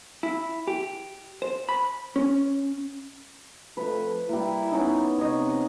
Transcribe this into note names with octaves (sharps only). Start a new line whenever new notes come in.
E4
G4
C5
B5
C#4
F2 A3 B4
G3 A#3 E4
B3 C#4 D#4
C3 C#5 D#5